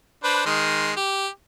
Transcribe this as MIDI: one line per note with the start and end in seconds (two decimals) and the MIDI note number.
0.24 0.43 62
0.24 0.43 71
0.24 0.43 72
0.46 0.92 51
0.46 0.92 56
0.46 0.92 84
0.96 1.27 67